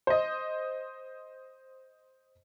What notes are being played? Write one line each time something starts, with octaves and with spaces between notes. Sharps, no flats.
C5 D#5